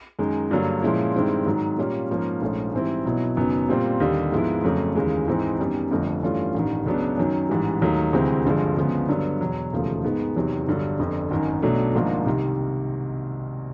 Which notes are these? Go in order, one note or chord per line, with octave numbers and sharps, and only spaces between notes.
F#2 D#3 G#3
G2 D3 F#3 A#3
A#2 F3 G#3 C#4 E4
G2 D#3 G#3 C4 E4
G#2 D#3 F#3
A#2 G3 A#3 C#4 F4
G#2 F3 A#3 C#4
A#1 G#2 F3 A3 C#4
G#2 E3 G3 C4 E4
B1 B2 F#3 B3 E4
F#1 F#2 D#3 F#3 B3
A#2 G3 C4 F4
D#2 D3 G3
G#2 F3 G#3 B3 E4
F2 C#3 F#3 A3
D#2 C#3 E3 G#3
G#2 E3 G#3 C4 D#4
F#2 D#3 G3 B3
G1 F2 D3 F3 A3
G2 E3 A3 C#4 F4
A1 G2 D#3
C#2 C#3 F#3 B3 D4
F#2 D#3 F#3
A1 G#2 E3 G3
D#2 D#3 F#3 A3
D2 C3 E3 G#3 C4
G1 G2 D3 F3 G#3
D2 C#3 F3 G#3 B3
G2 D3 F#3 B3
E2 B2 F#3
E1 D#2 C#3 F3 A3
G#2 D#3 G#3 B3
E2 C3 D#3 F#3
G1 G2 D3 F#3
G1 F2 D3
G#1 F#2 D#3
B1 B2 F#3 A3 D4
G#1 G#2 F3 A#3 D4
C2 C3 D#3